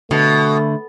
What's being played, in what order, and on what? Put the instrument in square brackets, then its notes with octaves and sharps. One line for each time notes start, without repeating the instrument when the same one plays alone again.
[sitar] B2 [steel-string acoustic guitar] D3 [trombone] A3